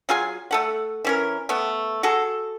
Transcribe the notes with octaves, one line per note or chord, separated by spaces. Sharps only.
F#3 F4 G#4 G#5
A3 A4 F#5
E3 C#4 A#4
A3 B3
F#4 G#4 A4